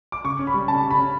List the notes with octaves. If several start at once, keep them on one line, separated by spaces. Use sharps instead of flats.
D6
C#3 C#6
C#4
B5
G3
C#3 A5
C#3
B5
C#4